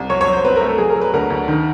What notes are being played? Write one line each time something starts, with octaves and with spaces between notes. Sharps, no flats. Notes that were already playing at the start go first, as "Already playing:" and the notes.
Already playing: C2
F#3 C#5
C#5
F#3
C5
C4 B4
A#4
A3
A4
F#3 G#4
A#4
F#3
B4
D2 A#4
D2
D#3